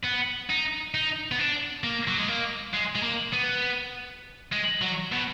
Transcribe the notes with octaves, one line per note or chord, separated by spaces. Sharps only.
B3
D#4
D#4
B3
D4
A#3
F#3
G#3
A#3
G#3
G#3
A#3
B3
G#3
F#3
B2